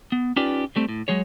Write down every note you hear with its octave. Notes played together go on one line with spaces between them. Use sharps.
B3
C#4 D#4 F4 G4 B4 D5
G3 A3 C4
A2
F#3 G#3 G#4 C#5